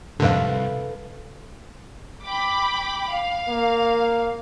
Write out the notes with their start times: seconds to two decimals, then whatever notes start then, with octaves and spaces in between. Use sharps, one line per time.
0.20 C2 F2 G#2 D3 A4 B4 F5
2.24 G5 B5 D6
3.11 F5
3.49 A#3